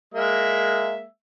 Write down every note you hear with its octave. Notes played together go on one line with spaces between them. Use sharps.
G#3 A#3 E5